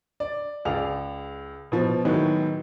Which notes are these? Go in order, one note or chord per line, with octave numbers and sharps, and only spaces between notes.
D5
C#2 G#4 D5 F7
B2 F3
A2 D#3 F#3 G#3 B3